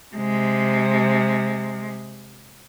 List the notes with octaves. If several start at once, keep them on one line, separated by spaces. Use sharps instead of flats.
C3 G#3